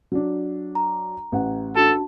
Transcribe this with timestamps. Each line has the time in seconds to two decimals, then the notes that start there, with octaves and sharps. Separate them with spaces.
0.12 F#3 D4
0.75 A#5
1.32 A1 F#5
1.76 D4 F#4 A4 A5